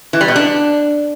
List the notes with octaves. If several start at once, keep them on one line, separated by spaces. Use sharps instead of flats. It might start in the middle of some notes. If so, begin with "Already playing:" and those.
E3
G3
B2
D4